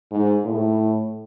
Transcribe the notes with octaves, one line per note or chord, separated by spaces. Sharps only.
G#2
A2